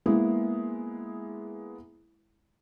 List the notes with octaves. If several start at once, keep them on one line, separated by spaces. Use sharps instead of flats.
G#3 A#3 B3 E4